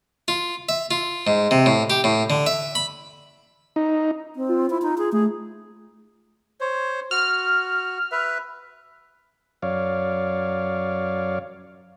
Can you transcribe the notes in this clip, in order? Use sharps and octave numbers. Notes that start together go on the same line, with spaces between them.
F4
E5
F4
G#2
C3
A2
G4
A2
D3
E5
B5
D#4
C4
F4
E4
D#4
G#4
A3 G#4
C5 C#5
F#4 F6
B4 E5
F#2 C#5 D5 F5